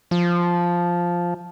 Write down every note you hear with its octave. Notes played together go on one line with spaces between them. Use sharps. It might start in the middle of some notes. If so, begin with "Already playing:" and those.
F3